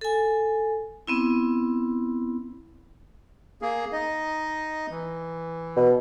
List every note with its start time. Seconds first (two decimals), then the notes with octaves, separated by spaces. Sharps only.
0.01 A4 G#5
1.07 B3 C4 E4
3.62 A#3 G#4
3.92 D#4 D#5
4.90 E3
5.76 B2